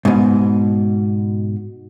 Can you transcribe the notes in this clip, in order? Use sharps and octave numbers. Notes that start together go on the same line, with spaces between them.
G#2 B2